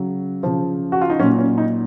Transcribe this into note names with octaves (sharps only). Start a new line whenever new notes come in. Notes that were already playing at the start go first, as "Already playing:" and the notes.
Already playing: C#3 F#3
C#3 F3
F#4
F4
D#4
A#2 F#3 C#4
C#4
D#4